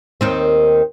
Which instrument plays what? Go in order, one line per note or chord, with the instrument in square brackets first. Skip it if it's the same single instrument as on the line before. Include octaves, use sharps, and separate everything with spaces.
[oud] D#2 D#3 C4